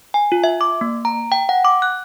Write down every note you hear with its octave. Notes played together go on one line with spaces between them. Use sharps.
G#5
F4
E5
D6
A#3
A#5
G5
F#5
D6
F#6